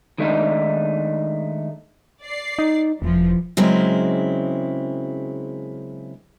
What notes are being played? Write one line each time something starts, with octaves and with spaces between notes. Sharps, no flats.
D#3 G#3 A3 D4 D#4
D5 C7
D#4
E1 E3 F3
C#3 F#3 G#3 A#3 C4 E4